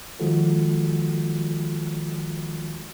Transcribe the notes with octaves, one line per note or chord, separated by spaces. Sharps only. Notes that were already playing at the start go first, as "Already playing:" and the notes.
D#3 F3 G#3 F4 F#4 A4